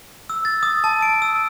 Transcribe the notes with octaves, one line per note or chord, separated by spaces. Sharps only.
E6
A6
D#6
A5
D7
E6